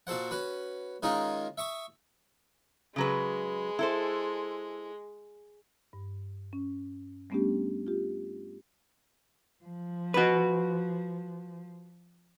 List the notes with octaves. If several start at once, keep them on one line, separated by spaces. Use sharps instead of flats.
A#2 F#4 A4 C5 F#5
C#4 F#4 B4
D#3 G#3 C#4 D#4 F4 A#4
E5 C#6 D#6
C#3 F#3 G#3 B4
E4 A4 C5
G2
C#4
G3 A3 B3 C#4 D4 G4
F4 G4
F3
F#4 B4